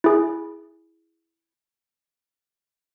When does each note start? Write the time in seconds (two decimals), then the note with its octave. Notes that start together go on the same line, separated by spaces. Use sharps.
0.04 E4 G#4